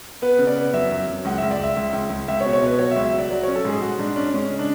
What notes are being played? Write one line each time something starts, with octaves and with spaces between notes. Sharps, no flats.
B3 B4
C#3
D5
B3
F#2 E5
F#2
F#2
C#2 F#5
E5
C#2
D5
C#2 E5
C#2
C#2
C#2
C#2 E5
C#5
B2
C#5
B2 B4
F#3 C#5
E5
C#2
E5
F#3
D5
F#3 D5
C#5
C#4
A4
G#2 G#4
G#2 F#4
G#2 D4
C#4 D4
G#3 C#4
C#3
D4